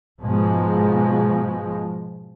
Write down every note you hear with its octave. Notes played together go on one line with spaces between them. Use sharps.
G#2 B2 F3 G#3